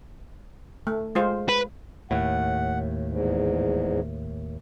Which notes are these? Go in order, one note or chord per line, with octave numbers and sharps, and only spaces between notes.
A3
G#3 F4 C5
B4
D#2 A2 F#5
E2 G#2